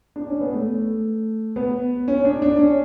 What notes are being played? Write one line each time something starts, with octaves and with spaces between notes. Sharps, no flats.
D4
C#4
B3
A3
B3
C#4
D4
D4
C#4